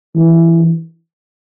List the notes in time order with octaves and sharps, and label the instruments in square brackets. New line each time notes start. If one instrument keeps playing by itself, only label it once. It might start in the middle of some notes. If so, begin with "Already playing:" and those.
[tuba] E3